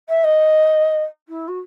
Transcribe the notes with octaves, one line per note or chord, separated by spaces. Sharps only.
E5
D#5
E4
F#4